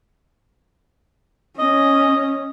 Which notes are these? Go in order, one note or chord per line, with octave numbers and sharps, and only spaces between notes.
C#4 D#5